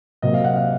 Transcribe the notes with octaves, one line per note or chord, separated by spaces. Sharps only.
C3 F#3 A#3 D#5
F5
F#5
F5